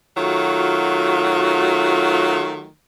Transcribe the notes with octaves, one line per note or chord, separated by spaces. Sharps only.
D#3 F#3 A3 F4 F#4